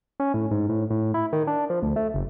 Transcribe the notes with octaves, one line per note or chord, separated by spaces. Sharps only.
C#4
A2
G#2
A2
A2
E4
D#3
D4
F3
D2
A3
F#1